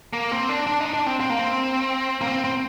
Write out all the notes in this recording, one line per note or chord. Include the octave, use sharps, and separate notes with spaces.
A#3
C4
D4
D4
D#4
D4
C4
C4
A#3
C4
A#3
C4
C4